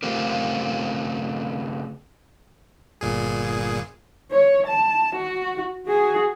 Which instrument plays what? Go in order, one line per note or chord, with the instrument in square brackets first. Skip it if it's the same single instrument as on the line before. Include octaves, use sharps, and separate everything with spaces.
[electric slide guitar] C#3 A3 C4 F4 G4 A#4
[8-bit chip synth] G1 A#2 G#4
[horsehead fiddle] C#5
A5
F#4
F#4 G#4